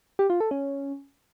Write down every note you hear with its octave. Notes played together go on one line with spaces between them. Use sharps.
G4
F4
A4
C#4